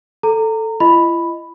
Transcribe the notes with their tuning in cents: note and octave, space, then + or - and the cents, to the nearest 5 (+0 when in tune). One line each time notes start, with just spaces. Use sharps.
A4 +0 A#5 -25
E4 +45 D#5 +0 B5 +0